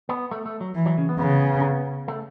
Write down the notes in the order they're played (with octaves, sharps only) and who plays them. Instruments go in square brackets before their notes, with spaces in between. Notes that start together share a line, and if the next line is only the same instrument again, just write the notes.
[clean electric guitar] B3
A3
A3
F#3
[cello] E3
[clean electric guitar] F#3
C#3
B3
[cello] C#3 [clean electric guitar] B3
[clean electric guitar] A3